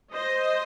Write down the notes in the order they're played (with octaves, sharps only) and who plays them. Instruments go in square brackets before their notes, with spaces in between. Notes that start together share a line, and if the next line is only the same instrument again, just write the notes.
[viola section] C5 D#5